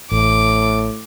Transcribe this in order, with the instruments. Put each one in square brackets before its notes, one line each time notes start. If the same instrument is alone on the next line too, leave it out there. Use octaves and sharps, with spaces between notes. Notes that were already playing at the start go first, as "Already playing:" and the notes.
[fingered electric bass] A1 [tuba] A2 [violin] D6